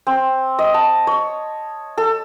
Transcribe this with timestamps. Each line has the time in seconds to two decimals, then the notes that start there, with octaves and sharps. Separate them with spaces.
0.07 C4
0.59 D#5
0.74 A5
1.07 C#5
1.98 A4